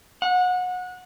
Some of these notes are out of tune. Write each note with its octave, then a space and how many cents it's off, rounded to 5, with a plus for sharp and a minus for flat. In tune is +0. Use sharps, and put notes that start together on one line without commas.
F#5 -25